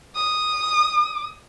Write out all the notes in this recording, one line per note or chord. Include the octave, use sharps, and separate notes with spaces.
D#6